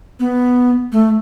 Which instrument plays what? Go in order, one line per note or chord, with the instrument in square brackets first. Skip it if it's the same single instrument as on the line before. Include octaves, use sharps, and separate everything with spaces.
[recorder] B3
A3